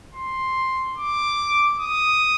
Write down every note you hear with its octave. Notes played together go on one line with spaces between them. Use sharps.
C6
D6
D#6